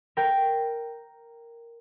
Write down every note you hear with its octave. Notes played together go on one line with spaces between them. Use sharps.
A#4 G5